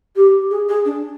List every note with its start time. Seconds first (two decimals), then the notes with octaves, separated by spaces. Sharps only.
0.16 G4
0.51 G#4
0.68 G#4
0.85 D4